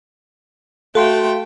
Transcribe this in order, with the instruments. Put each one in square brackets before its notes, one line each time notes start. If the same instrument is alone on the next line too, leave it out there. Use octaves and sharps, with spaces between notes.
[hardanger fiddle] A3 G5 [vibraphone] F#4 [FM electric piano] A4 F5 C6